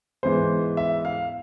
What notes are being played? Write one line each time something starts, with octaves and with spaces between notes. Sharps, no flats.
G#2 E3 B3 C5
E5
F5